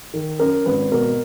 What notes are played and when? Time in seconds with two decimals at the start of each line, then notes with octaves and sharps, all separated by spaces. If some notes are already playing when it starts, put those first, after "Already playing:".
0.14 D#3
0.40 F#2 A#4
0.66 G#1 B4
0.92 B2 A#4